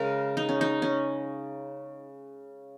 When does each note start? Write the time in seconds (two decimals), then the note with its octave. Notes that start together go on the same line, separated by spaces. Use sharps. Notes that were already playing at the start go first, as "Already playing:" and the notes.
Already playing: C#3 G#3 A#4
0.37 D#4
0.49 C#4
0.61 D#4
0.82 C#4